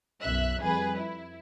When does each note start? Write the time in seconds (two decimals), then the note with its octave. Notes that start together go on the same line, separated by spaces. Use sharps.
0.22 B1 F#2 E5 F#6
0.61 F2 G3 G#4 B4
0.96 E4